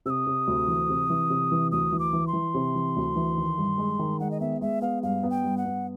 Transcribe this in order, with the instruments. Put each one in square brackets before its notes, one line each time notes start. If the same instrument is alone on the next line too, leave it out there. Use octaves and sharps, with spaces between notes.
[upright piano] C3 [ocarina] E6
[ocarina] D#6
[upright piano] C3
D2
E3
C3
E3
C3
E3
[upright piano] D2 [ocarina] D#6
[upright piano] E3
[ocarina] D6
[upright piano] E3
[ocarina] C6
[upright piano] E3
C3
E3
D2
E3
D#3
G2
G#3
D#3
[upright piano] G#3 [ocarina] F#5
[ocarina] D#5
[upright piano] B3 [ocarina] E5
[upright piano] G#3 [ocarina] E5
[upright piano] B3 [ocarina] F5
[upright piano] G2 [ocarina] F5
[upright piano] B3
[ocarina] G5
[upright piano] G2
[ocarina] F#5
[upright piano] B3